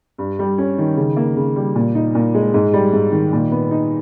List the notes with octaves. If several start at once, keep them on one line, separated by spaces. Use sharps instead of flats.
G2
G3
C#4
D#3
C#3
A#3
C#3
G3
A#2
D#4
A#2
G#3
G#2
G3
G#2
D#3
A#2
B3
D#4